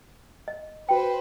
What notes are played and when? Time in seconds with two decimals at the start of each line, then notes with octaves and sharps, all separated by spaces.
0.48 D#5
0.89 F#4 B4 C5 G5